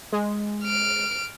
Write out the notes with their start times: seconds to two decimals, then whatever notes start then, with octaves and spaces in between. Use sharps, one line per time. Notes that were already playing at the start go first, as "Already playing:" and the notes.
0.13 G#3
0.64 F6 D7